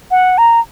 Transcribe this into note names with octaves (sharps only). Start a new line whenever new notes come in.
F#5
A#5